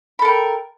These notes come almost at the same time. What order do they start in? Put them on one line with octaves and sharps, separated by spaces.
B5 A4 A#4 G5